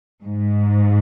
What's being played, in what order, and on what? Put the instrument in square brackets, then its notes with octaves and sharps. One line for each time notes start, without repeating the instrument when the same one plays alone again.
[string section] G#2